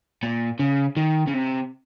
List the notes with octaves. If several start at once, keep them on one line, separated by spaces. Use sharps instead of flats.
A#2
C#3
D#3
C#3
C3